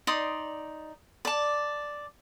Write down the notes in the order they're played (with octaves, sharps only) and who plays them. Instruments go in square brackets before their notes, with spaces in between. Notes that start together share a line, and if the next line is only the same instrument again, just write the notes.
[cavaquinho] D#4 D5 C6 D#6
D5 A5